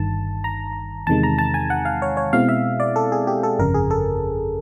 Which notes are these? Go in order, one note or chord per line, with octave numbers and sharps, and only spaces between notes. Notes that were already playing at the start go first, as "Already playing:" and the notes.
Already playing: G1 G2 D#3 A5
A#5
E2 C3 D#3 G#3 A5
A#5
A5
G#5
F#5
F5
C#5
C#5
B2 G#3 C4 E4 F5
E5
D5
A4
G#4
G4
A4
G1 F2 C#3 A#4
G#4
A4